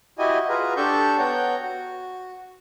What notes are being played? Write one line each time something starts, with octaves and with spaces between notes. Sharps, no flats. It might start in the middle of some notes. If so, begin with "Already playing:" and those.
E4 F#4 G4 D#5 G#5
F4 F#4 G#4 B4 A#5
D4 G4 A4 A5 C#6 G6
B3 C#5 F#5 G5 A#5 G6
F#4